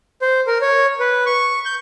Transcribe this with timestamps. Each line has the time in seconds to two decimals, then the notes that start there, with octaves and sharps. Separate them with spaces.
0.22 C5
0.47 A#4
0.61 C#5
1.00 B4
1.26 C#6
1.65 G6